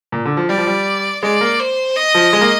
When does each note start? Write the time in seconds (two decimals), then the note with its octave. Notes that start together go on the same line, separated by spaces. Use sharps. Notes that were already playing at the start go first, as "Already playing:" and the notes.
0.12 A#2
0.25 D3
0.37 F3
0.49 G3 D5
0.58 F3
0.67 G3
1.23 G#3 D5
1.41 A#3
1.60 C5
1.96 D#5
2.15 F3
2.33 G#3
2.41 A#3